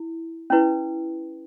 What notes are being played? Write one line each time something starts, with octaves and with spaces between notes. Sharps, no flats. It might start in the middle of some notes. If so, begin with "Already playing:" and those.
Already playing: E4
C#4 E4 B4